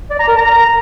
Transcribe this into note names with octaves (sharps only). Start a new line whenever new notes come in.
D5
A#5
A#4
A#5